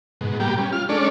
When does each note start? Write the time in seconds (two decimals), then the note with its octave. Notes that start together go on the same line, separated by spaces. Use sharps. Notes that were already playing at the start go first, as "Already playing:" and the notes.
0.21 G#2 B2
0.40 G3 A#3 B3 G4
0.58 G3 C#4
0.73 F4 F6
0.89 G#3 C#4 D4 A4 C#5 D5